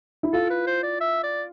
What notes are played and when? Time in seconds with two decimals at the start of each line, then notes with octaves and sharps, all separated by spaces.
0.23 E4
0.33 F4 A4
0.50 B4
0.67 C5
0.83 D5
1.01 E5
1.23 D5